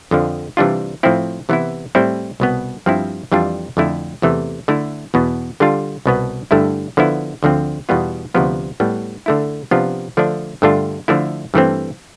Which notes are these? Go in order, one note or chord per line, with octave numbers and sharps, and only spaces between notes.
F2 D3 F3
C3 E3 G3 D4 F4
A2 F3 C4 E4
C3 E3 B3 E4
A2 G3 C4 E4
C2 B2 B3
G2 F3 C4 E4
F2 E3 G3 D4 F4
F2 D3 A3 E4
E2 C3 E3 A3
D3 A3 E4
E2 B2 B3
D3 G3 D4 F4
C2 B2 B3
G2 D3 A3 E4
D3 F3 B3 E4
D2 D3 F3 C4
E2 B2 G3 B3 F4
D2 C3 F3 B3
A2 G3 B3
D3 A3 E4
C3 F3 B3 D4 F4
D3 F3 A3 D4
G2 D3 A3 D4 F4
D3 F3 A3 E4
G2 E3 A3 C4